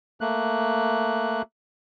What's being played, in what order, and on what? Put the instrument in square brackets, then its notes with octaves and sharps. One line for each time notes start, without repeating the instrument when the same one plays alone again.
[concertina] A3 A#3 F#6